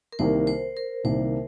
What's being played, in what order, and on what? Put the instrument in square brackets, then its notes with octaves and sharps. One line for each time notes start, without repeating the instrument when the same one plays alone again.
[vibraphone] A#4
[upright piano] C2 C3 D#3 A#3 [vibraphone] C5
[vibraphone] C5
A#4
[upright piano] C2 C3 D#3 A#3 [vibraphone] C5